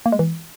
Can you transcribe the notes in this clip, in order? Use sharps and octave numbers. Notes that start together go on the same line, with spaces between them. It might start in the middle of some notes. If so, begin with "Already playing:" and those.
A#3
G#3
E3